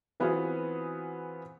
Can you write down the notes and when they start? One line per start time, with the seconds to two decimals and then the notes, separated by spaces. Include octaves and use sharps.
0.20 E3 B3 C4 F4 F#4 G#4